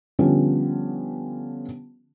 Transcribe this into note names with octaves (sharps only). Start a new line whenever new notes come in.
D3 F3 G3 B3 C#4